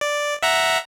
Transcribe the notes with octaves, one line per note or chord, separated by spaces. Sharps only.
D5
E5 F#5 A#5